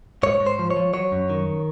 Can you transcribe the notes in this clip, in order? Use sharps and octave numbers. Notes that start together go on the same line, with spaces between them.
G#2 C#5
G#2
C5
F3
C#5
F3
F#3 C#5
F#2
D#3